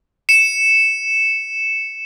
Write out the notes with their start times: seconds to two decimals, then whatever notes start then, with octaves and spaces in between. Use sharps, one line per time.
0.29 C#7 E7